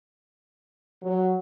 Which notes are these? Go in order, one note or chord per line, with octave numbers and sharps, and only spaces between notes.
F#3